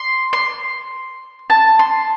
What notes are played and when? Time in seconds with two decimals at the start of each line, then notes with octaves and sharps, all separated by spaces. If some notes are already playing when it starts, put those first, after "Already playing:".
Already playing: C6
0.33 C6
1.50 A5
1.79 C6